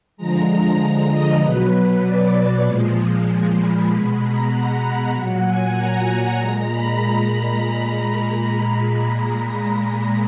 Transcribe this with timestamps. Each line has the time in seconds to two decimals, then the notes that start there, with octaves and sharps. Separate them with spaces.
0.17 D3 F3 G#3 A#5
1.11 D#5
1.42 B2 F#3 B4
1.73 B4
2.04 D5
2.65 A#2 F3 G#3
3.58 B5
3.89 B2 G#3
4.21 A#5
4.52 F#5
5.13 A#2 F#3
5.44 G#5
5.75 A#5
6.38 A#2 G#3
6.69 B5